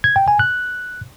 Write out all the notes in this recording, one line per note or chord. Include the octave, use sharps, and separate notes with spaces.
G#6
G5
G#5
F#6